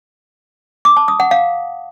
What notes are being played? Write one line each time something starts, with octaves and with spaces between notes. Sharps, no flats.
D6
A5
D#6
F#5
F5